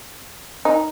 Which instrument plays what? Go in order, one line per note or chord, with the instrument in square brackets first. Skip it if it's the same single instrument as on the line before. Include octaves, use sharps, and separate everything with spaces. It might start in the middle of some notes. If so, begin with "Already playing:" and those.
[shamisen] D#4